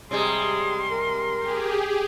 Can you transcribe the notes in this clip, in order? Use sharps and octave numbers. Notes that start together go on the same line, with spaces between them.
C3 G3 G#3 G#4 C6
A#4
G4 G#4